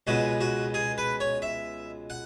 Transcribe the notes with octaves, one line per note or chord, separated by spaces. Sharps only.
C#2 B2 G#3 F#4
F#4
G#4
B4
C#5
E5
F#5